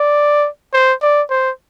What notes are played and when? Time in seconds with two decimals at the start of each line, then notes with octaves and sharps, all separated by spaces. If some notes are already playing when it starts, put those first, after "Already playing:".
Already playing: D5
0.73 C5
1.02 D5
1.30 C5